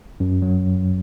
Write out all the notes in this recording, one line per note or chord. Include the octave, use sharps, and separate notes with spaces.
F#2
F#3